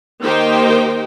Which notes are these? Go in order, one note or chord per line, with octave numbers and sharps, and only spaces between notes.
D#3 A#3 D#4 G4 C5 G5